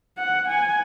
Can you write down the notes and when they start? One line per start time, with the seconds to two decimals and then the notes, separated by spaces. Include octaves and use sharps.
0.18 F#5
0.48 G#5